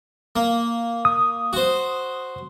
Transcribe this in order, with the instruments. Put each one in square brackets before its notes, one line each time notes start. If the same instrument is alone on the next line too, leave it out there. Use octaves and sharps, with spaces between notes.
[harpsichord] A#3
[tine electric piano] D#6
[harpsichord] F#4 C5